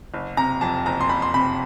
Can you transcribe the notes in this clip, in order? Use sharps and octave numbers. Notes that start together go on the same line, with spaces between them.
F#1
C3 A#5
F2 A5
F#1 A#5
C6
F#1 B5
C6
C3 B5